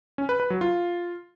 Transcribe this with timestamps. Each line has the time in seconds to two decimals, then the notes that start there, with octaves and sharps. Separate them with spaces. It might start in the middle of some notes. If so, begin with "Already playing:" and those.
0.18 C#4
0.29 B4
0.40 B4
0.50 F#3
0.61 F4